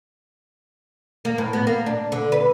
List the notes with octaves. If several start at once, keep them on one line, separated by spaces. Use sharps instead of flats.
A#3
A2
B3
A#3
D4
D3
B4